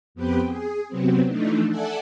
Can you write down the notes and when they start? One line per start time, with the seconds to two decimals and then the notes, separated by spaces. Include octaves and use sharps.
0.15 F2 B3 C4 G4 B4 G5
0.48 G#4
0.88 C3 F#3 B3 C4
1.28 E3 F3 A3 D4 D#4
1.68 A4 D5 E5 F#5 G#5 A5